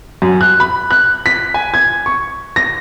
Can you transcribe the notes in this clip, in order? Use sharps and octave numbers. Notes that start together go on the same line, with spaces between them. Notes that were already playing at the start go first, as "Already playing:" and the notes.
F#2
F#6
B5
F#6
B6
G#5
G#6
C#6
A#6